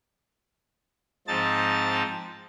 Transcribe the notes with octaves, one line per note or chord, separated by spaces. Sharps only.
G#2 F3 C4 D#4 A5 A6